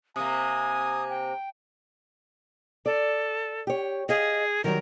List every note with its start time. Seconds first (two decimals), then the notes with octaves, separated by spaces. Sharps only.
0.16 C3 A#3 G#5 D#6
1.10 G5
2.86 A4 D5
3.67 G4 C#5
4.09 G#4 D#5 F5
4.64 D#3 F#3 G3 A#4